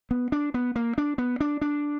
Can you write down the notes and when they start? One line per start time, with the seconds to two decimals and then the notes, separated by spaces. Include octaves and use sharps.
0.11 B3
0.32 D4
0.54 B3
0.76 A#3
0.98 D4
1.18 B3
1.40 D4
1.61 D4